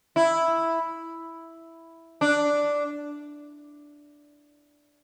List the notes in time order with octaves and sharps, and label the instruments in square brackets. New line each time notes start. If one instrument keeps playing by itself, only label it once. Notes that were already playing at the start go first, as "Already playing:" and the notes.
[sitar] E4
D4